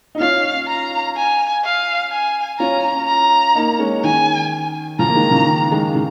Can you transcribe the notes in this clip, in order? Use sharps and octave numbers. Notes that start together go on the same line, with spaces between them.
D#4
C#4 F4 F5
A#5
G#5
F5
G#5
C#4 F4 A#5
A#5
A#3 D#4
G#3 C#4
D#3 G#5
C#3 F3 A#5
A#3
D#3 G#3
C#3 F3
D#3
D#3 G#3
C#3